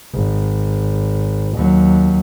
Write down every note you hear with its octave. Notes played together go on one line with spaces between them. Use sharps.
G#1
D#2 F#3